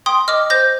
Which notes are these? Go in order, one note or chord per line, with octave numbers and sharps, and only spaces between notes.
G5 C6 D#6
D#5 D6 F6
C5 G6 A#6